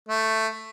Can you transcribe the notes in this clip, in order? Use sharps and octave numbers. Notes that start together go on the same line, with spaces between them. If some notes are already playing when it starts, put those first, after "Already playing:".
A3